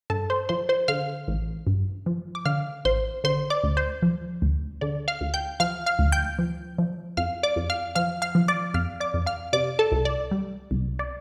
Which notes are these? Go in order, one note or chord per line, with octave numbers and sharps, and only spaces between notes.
G2 A4 A5
C5 C6
F3 C5 C6
C5 C6
D3 F5 F6
A1
G2
F3
D6
D3 F5 F6
A1 C5 C6
D3 C5 C6
D5 D6
D2
C5
F3
D2
D3 D5
F5 F6
D2
G5 G6
F3 F5 F6
F5 F6
D2
G5 G6
F3
F3
F2 F5 F6
D5 D6
F2
F5 F6
F3 F5 F6
F5 F6
F3
D5 D6
F2 F5 F6
D5 D6
F2
F5 F6
C3 D5 D6
A4 A5
C2
D5
G3
C2
D5